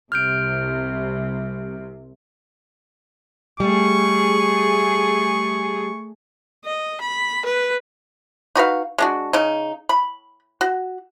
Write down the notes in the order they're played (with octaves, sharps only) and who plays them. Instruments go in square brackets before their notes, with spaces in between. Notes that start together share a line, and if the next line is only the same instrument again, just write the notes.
[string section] C2 C3 [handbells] F6 G6 D7
[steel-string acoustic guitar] G3 [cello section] A3 G#4 [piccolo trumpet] C#6
[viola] D#5
B5
B4
[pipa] D#4 F#4 B4 F5
G#3 D4 F#4
C#3 D#4
B5
F#4